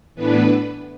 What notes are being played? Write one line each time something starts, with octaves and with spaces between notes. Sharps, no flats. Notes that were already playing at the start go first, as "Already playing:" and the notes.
A2 E3 B3 D4 B4